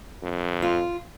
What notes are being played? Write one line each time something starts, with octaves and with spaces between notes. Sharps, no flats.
F2
F4